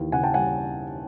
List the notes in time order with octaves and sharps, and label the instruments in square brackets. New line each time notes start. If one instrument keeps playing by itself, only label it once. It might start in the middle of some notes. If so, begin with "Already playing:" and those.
Already playing: [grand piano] D#2 E3
C#3 F#5 G#5
G5 A5
G3 F#5 G#5